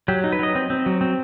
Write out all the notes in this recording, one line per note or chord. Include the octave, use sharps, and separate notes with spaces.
F#3 G4
D#4
B4
F#3 D#5
C4
C4
F#3
C4